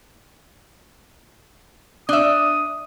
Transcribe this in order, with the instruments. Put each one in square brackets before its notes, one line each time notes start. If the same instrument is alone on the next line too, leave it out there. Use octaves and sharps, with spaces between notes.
[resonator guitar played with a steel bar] D4 E5 [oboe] D#6